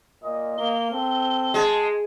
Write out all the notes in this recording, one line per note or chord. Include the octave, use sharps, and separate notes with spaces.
A#2 D#5
A#3 G7
C4 A4
G#3 G#4 A5